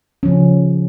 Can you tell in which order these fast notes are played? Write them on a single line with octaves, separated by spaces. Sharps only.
C#4 F3 C#3